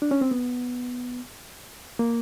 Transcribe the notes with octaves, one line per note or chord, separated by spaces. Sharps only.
D4
C#4
C4
B3
A#3